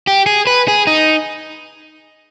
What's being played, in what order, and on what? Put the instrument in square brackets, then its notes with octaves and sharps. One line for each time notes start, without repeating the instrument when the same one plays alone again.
[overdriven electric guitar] G4
G#4
B4
G#4
D#4